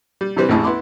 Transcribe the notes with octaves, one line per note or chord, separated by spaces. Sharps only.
G3
C3 E3 G3 C4 B4
A1 F2 A3 E4 G#4
B3 E4 C6 D6